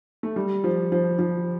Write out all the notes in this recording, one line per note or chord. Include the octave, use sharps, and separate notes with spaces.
A3
G3
F3
F3
F3